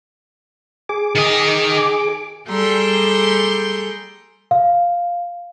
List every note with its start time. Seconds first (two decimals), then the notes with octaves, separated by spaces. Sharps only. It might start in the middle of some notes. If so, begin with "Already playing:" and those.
0.89 G#4 D6
1.15 D#3 D#5
2.48 G3 G#4 A4 G5 A#5 C6
4.51 F5